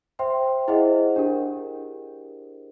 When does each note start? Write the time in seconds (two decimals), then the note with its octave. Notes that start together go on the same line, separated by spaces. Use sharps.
0.19 C5 E5 G5 C6
0.68 E4 G#4 C5 D#5 F#5
1.16 D4 G4 A#4